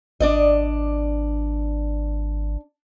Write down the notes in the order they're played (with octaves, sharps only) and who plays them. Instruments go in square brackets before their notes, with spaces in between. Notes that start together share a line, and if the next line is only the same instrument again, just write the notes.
[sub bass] G#1 [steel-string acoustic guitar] D4 D5 D#5